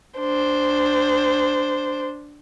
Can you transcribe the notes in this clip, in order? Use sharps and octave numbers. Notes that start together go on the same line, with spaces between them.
D4 C5